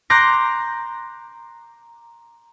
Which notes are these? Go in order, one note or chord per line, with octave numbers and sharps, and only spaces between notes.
A#5 C6 D6 F#6 G6 A#6